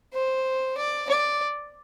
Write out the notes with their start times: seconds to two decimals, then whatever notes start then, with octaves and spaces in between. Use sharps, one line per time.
0.14 C5
0.77 D5
1.10 D5